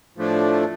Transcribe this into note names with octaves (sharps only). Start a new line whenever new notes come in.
A2 F3 A3 D4